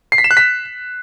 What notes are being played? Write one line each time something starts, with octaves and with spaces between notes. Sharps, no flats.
C7
B6
E7
F#6
B6